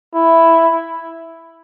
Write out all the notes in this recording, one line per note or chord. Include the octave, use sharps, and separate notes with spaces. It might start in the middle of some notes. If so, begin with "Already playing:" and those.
E4